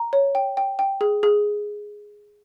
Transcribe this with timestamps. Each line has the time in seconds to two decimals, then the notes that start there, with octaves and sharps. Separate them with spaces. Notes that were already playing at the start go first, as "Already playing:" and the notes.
Already playing: A#5
0.13 C#5
0.35 G5
0.57 G5
0.79 G5
1.01 G#4
1.23 G#4